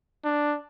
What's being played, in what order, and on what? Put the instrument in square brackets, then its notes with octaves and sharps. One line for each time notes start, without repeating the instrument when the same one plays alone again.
[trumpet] D4